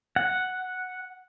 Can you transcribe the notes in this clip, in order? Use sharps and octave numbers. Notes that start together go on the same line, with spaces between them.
F#5